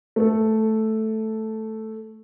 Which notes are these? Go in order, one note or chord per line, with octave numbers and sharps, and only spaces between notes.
A3 A4